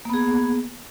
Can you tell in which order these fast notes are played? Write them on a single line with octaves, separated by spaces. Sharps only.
A#3 B3 G#4